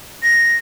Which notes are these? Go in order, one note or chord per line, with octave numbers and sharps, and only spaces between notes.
A#6